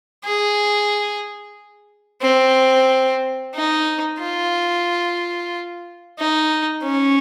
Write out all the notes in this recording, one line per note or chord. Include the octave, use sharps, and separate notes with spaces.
G#4
C4
D#4
F4
D#4
C#4